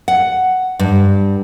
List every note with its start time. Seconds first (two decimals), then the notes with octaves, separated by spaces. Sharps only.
0.08 F#5
0.79 G2